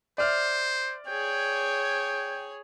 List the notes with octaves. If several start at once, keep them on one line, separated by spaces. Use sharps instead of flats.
C5 D5 E5 F6
G#4 C#5 G5